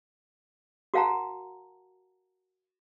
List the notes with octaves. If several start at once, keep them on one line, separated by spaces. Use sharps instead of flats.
F#4 A#4 F5 F#5 A5 A#5